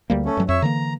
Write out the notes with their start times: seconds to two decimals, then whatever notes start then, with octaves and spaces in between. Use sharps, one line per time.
0.10 D2 G3 A#3
0.26 A3 C#4
0.37 G2 F#3
0.49 F2 C#5 E5
0.62 D3 E3 A#3 A#5